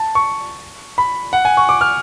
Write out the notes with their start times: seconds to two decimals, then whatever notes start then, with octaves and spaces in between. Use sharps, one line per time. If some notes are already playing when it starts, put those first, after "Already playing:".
Already playing: A5
0.15 C#6
0.98 B5
1.33 F#5
1.45 G#5
1.57 C#6
1.69 D6
1.81 F6